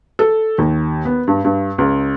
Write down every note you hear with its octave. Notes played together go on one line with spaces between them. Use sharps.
A4
D#2
B3
G2
G2
C#2